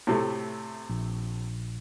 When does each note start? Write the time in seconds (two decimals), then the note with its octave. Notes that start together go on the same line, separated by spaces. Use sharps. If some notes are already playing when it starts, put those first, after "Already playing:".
0.07 A2 C3 A3
0.89 A#1